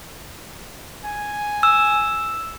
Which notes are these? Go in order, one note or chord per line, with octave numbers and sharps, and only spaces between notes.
G#5
E6